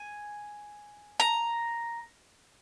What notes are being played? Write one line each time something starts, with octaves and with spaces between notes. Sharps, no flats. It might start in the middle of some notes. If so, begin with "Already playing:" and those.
Already playing: G#5
A#5